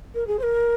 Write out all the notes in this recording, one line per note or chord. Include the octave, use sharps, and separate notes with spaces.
A#4
G#4
C5
A#4